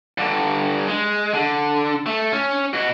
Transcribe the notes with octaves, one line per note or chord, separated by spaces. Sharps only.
G2 D3
G#3
D3
A3
C#4
B2 F#4